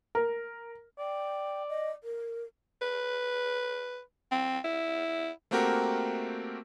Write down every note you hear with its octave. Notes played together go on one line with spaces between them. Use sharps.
A#4
D5 G5
D#5
A#4
B4
C4
E4
A3 A#3 C4 F#4 G4 A#4